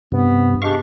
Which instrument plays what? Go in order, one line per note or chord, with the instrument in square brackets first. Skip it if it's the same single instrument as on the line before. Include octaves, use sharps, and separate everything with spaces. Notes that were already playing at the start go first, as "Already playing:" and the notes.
[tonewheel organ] G2 C3 [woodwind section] B3
[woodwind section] G#3 D4 G4 [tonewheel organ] F5 C#6